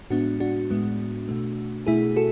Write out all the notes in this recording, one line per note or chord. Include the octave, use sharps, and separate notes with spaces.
A2 G#3 B3 D4 F#4
D4 F#4
A2 G#3 B3
B2 A3
B2 A3 E4 G#4
F#4 A4